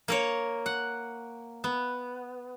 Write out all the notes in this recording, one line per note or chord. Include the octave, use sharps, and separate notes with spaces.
A#3 A#4 C#5
F#5
B3